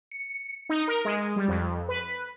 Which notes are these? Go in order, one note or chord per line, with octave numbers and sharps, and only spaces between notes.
C#7
D#4
A#4
G#3
G3
F2
B4